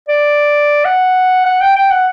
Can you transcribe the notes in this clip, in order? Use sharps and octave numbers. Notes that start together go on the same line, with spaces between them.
D5
F#5
F#5
G5
G5
F#5